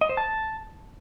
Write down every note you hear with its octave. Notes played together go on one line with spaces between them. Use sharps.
D#5
C5
A5